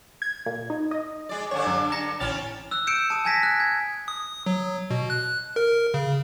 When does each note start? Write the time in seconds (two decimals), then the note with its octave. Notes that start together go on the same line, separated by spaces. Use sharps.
0.22 G#6
0.46 A#2
0.70 D#4
0.91 D#5
1.29 G#3 D5
1.51 G2 D3 D4 C#5
1.67 F#2
1.92 A#5 C#7 E7
2.20 A1 C4 C#4 F6 A6
2.71 E6 F#6
2.87 E6 G6 C#7 D7 E7
3.10 A5 D#6
3.25 G#5 A5 G#6 A#6 B6
3.43 F#6
3.60 G#6
4.08 D#6
4.46 F#3
4.90 B2
5.10 F#6
5.56 A#4
5.94 C#3